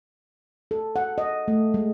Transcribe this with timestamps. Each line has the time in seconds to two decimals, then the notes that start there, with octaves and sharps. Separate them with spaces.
0.71 A4
0.96 F#5
1.18 D#5
1.48 A3
1.74 G#3